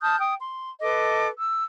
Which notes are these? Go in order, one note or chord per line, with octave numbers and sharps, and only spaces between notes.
A5 D#6 F6 G6
G5 D#6
C6
A4 B4 D#5 D6
E6